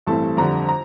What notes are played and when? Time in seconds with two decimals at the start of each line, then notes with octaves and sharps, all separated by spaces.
0.06 A1 G2 E3 A3 C4 A5
0.37 F2 D3 G3 A#5
0.69 A#5